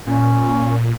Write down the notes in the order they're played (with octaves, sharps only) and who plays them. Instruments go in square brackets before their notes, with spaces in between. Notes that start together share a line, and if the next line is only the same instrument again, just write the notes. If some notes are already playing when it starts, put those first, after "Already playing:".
[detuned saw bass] A#2 [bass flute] C#4